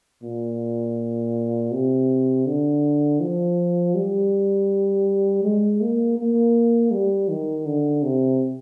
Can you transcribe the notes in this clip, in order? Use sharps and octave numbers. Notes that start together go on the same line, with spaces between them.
A#2
C3
D3
F3
G3
G#3
A#3
A#3
G3
D#3
D3
C3